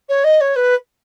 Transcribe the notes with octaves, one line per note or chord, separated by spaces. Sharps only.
C#5
D#5
C#5
B4